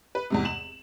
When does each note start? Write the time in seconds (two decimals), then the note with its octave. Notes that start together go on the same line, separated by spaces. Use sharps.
0.15 B4
0.30 E2 G#2 C3
0.45 E7 F#7